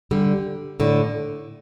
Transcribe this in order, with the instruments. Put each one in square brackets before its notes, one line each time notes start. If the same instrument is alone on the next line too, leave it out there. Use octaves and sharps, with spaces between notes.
[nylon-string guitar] D3 G3
A2 D3